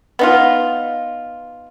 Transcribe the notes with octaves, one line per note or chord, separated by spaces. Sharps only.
B3 D#4 F4